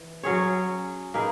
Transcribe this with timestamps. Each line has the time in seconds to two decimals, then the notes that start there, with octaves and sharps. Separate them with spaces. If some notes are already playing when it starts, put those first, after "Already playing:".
Already playing: E3
0.23 F#3 C#4 G#4 C#5
1.14 A#3 D#4 G#4 B4